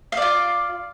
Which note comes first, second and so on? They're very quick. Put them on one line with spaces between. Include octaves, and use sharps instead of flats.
F5 D5 F4